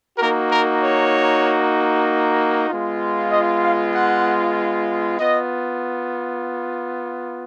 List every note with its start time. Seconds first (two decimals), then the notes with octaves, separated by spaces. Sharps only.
0.18 A#3 D#4 F#4 A#4
0.50 A#4
0.81 C#5
2.68 G#3 B3 F4
3.31 D#5
3.62 F5
3.94 F#5
5.19 B3 F4 D#5